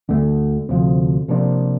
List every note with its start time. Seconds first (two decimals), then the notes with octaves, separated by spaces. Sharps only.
0.09 D2 D3 A3
0.69 D2 C3 F3
1.28 C3 F3 A#3 D4